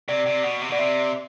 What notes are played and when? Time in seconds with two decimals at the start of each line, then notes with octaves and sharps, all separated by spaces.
0.08 C3 D5
0.26 C3
0.43 B2
0.61 C3
0.70 B2 D5
0.78 C3 E5